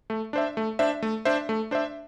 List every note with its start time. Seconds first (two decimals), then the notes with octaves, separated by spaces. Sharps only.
0.10 A3
0.33 D4 C5 E5
0.57 A3
0.79 D4 C5 E5
1.02 A3
1.25 D4 C5 E5
1.49 A3
1.71 D4 C5 E5